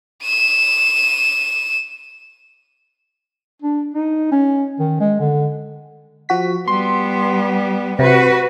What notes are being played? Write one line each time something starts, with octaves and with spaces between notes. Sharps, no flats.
D#7 E7
D4
D#4
C#4
D#3
G#3
D3
F3 F#4 B6
G3 B3 C6
C3 F#4 B4